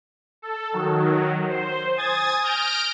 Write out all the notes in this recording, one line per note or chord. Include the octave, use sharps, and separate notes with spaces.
A4
D#3 F#3
C5
G#5 D#6 G#6 A6
F6 G6 A#6 D7